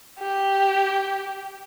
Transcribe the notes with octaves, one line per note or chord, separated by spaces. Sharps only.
G4